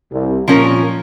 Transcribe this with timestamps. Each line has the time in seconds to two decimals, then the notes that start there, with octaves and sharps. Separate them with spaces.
0.12 C2
0.48 A#2 F3 C#4 A#4